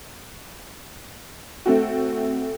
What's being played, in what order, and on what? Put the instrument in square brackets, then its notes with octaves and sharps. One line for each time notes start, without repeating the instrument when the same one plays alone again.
[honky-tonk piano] A3 C4 F#4